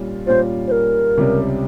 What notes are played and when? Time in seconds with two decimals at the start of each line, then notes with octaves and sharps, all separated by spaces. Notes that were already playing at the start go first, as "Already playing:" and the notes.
Already playing: A#2 G3 C#4 F4
0.27 A#2 G3 C#4 F4 C5
0.68 C5
0.72 A#4
1.18 C#2 C3 G3 C#4